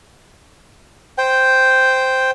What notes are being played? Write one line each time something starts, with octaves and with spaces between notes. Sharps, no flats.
C5 G5